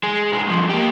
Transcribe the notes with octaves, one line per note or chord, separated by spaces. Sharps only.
G#3
B1 G#3
G2 F3
A#3 G4